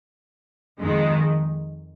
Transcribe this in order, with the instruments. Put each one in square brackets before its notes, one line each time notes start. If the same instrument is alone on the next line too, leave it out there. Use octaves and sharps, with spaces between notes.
[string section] F2 D#3 G#3